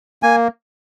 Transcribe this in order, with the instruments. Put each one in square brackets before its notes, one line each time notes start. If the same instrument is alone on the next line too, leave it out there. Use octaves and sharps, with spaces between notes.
[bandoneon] A#3 G#5